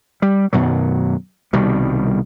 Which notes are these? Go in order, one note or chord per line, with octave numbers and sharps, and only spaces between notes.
G3
F#2 B2 D#3 F#3
C2 B2 D#3 G3